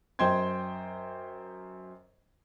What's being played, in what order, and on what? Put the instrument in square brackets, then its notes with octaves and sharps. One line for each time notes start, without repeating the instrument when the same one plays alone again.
[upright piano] F#2 C5 D#5 G5 C6 G#6